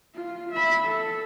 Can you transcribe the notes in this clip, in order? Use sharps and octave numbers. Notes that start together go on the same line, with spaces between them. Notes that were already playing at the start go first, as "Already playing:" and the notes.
F4
E5 B5
A4